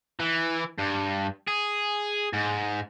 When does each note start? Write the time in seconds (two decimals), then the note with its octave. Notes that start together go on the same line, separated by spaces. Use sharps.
0.20 E3
0.78 G2
1.48 G#4
2.33 G#2